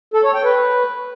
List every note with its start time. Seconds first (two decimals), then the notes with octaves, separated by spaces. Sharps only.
0.14 A4
0.24 C#5
0.34 G5
0.44 B4